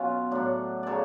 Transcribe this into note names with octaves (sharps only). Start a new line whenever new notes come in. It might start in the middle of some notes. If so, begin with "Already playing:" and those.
Already playing: B2 F#3 C#4 F4
A2 F#3 D4 F#4
C#3 F#3 A4 C#5 D5